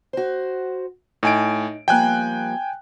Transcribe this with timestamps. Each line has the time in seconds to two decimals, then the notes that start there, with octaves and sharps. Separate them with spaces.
0.13 F#4 C5
1.23 A2 D#4 G#5 D7
1.88 F3 G3 A#3 G5 G#5 F#6